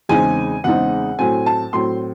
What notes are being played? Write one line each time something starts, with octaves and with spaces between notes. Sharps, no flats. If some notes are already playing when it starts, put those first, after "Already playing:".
E2 C#3 G#3 C4 D#4 G#5
E2 C#3 G#3 C4 D#4 F#5
A2 F#3 C4 G#5
A5
A2 F#3 C4 C6